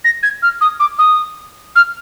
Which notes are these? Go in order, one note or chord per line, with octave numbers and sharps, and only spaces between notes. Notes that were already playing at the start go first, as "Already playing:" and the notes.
A#6
G#6
F6
D#6
D6
D#6
F6